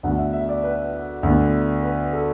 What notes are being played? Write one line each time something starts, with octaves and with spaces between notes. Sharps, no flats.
D2 D3 B3 F#5
E5
E5
D5
B4
D2 D3 B3
B4
A4